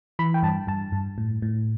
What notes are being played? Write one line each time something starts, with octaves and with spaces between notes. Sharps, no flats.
E3 B5
G5
G2 A5
G2 A5
G2
A2
A2